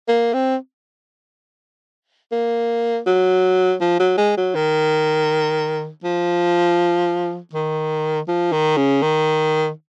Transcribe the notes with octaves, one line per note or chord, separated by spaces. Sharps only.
A#3
C4
A#3
F#3
F3
F#3
G#3
F#3
D#3
F3
D#3
F3
D#3
C#3
D#3